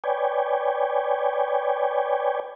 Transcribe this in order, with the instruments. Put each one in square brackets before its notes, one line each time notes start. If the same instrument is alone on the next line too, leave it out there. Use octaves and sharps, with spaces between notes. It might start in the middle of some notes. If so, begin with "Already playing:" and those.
[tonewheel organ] B4 C#5 D5 G5 G#5